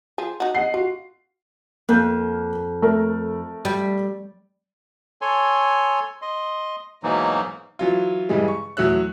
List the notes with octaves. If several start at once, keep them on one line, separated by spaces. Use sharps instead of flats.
F3 G#4
D#4 F#4
D#5 F#5 C7
F4 F#4
F2 A#3 G6
A3 A#4
G3
A4 C#5 G#5 C6
D#5 C6
G#2 B2 E3 F#3 A#3 D#4
E3 F#3 F4
G2 C#3 E3 G3 G#3
C#6
E2 F#3 A3 E6 F#6